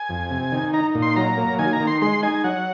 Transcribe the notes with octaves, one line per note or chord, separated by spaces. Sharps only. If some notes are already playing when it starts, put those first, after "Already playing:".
Already playing: G#5
F2
C3
D#3
D#4 A#5
A#2
C6
F#3 A#5
A#3
D#3 G#5
A#5
D#3
C6
G#3 C6
D#4 G#5
F#3 F#5